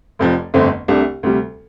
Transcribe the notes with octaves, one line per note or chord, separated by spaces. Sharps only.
F1 F2 F3
G1 F2 D3 A3 C4
C2 C3 A3 D4
D2 C3 G3